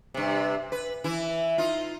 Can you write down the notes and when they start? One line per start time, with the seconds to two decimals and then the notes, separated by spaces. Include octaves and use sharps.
0.14 G2 C3
0.72 B4
1.04 E3 E4
1.58 D#4 F4